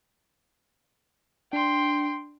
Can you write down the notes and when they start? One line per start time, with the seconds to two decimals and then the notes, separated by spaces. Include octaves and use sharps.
1.53 D4 G5 C6